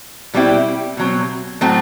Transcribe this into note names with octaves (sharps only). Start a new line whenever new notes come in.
B2 G3 C4 E4 G4
B2 F#3 C4
A2 F#3 A3 C4